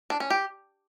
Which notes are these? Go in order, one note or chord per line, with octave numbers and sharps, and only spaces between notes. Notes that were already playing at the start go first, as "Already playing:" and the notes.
D4
C#4
G4